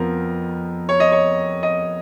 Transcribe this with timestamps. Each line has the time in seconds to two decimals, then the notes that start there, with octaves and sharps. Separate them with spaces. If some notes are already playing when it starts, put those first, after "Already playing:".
Already playing: F2 F3 B3 A#4
0.89 C#5
1.00 D#5
1.12 C#5
1.63 D#5